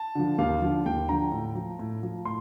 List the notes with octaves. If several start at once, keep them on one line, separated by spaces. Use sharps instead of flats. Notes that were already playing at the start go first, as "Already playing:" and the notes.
Already playing: A5
D3 F3
D#2 F5
D3 F3
D#2 G5
D3 F3 A#5
A2
F3
A2
F3
A2 C6